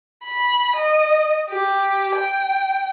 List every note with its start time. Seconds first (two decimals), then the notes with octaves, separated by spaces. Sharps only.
0.24 B5
0.76 D#5
1.50 G4
2.15 G5